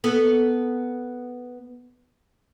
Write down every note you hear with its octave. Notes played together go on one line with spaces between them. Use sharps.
B3 A4